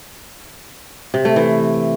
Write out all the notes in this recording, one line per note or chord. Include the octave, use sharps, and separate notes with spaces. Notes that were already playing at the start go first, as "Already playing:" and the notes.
C3
A3
E3